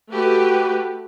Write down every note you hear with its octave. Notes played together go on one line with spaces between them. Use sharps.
A3 F#4 G4 B4